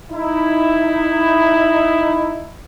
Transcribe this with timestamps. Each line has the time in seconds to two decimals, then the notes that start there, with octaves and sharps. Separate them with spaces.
0.11 D#4 E4